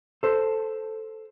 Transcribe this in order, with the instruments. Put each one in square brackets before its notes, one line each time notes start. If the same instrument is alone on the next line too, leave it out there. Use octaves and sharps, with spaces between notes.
[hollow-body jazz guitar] A4 C5